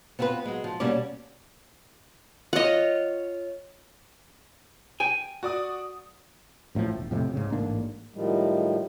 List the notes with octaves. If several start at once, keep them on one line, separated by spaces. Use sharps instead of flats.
B3 C4 F4 A#4 B4
F#3 G#3
F3
D2 B2 G3 A#3 C#4 D5
F4 C#5 D#5 F#5
G5 G#5
F#4 D5 D#6
A1 A2 D3 F3
E1
F2 A2 C3
G#2 C#3
A1 G#2 A#3 D4
A2 D#3 F3 G3 G#3